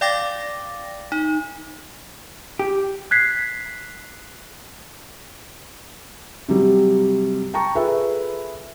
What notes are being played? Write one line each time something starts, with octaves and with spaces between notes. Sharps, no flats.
D5 F5 G5 D6 A6 A#6
D#4
G4
F#6 G#6 B6 C7
C3 F#3 G3
G5 A5 A#5 C#6
F4 G#4 A4 B4 E5